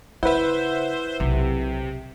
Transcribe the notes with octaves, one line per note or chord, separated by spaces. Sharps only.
C#3 E4 B4 C5 E5 F#5
B1 C3